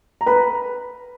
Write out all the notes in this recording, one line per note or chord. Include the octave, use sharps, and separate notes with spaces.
A#5
B4 B5